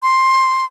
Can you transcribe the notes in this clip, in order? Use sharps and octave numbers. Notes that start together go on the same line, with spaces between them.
C6